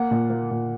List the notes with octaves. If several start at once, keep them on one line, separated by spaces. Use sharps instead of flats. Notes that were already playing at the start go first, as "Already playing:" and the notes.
Already playing: A#3 F#5
A#2
A#3
A#2